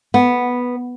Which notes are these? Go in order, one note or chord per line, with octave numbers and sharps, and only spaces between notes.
B3